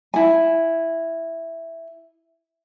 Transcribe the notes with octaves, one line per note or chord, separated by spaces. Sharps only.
E4 G#5